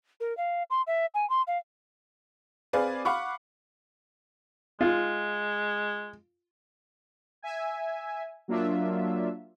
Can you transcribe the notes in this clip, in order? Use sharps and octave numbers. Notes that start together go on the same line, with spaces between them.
A#4
F5
C6
E5
G#5
C6
F5
C4 G#4 B4 D5 F5 G#5
F5 F#5 B5 C#6 D6
G#3 F4
E5 G#5
F#3 A#3 D4 F4 E5